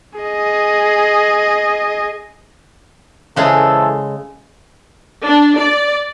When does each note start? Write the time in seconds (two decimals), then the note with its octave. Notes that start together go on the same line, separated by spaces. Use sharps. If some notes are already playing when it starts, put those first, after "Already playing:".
0.19 G#4 D#5
3.36 C#3 E3 G#3 G#4 A4 C5
5.25 D4
5.60 D5